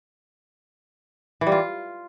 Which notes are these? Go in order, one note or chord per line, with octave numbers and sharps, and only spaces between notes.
E3
G3
F4